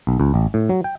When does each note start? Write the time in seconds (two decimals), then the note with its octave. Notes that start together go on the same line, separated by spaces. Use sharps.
0.07 B1
0.20 C#2
0.34 A1
0.54 A2
0.69 F#3
0.84 G5